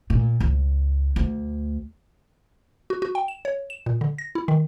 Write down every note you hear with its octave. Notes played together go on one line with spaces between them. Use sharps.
A#2
C#2
D2
F#4
F#4
G5
E7
C#5
E7
A#2
D3
A#6
E4
D#3